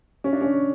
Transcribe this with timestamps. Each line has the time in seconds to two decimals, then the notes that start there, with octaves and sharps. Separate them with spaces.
0.24 C#4
0.33 D4
0.41 C#4